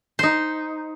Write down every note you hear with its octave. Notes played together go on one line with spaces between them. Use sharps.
D#4 C5